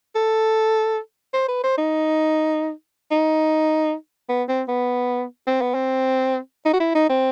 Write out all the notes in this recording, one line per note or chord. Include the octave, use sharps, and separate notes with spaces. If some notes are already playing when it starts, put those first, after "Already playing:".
A4
C5
B4
C5
D#4
D#4
B3
C4
B3
C4
B3
C4
D#4
F#4
E4
D#4
C4